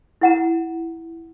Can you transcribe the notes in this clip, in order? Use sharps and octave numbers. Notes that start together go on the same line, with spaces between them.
E4 F#5 A#5